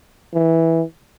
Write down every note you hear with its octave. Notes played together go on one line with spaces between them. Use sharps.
E3